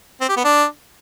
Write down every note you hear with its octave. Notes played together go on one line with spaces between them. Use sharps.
C4
G4
B3
D4